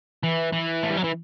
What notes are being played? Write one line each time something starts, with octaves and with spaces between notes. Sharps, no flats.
E3
E3
A3
G3
F#3
E3